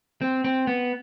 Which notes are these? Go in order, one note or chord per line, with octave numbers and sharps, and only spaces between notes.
C4
C4
B3